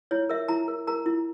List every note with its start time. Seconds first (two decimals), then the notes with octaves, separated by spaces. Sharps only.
0.11 E4 C#5
0.29 A#4 E5
0.48 E4 A#5
0.68 A#4
0.87 A#4 A#5
1.06 E4